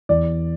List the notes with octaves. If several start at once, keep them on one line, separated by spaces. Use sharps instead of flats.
E2 D5